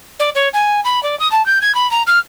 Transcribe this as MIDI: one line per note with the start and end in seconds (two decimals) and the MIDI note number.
0.19 0.30 74
0.35 0.48 73
0.53 0.80 80
0.84 1.02 83
1.03 1.18 74
1.19 1.30 87
1.31 1.45 81
1.46 1.59 91
1.61 1.75 92
1.75 1.89 83
1.91 2.02 82
2.07 2.19 89